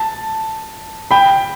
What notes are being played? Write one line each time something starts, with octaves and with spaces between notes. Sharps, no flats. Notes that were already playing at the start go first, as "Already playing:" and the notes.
Already playing: A5
G5 B5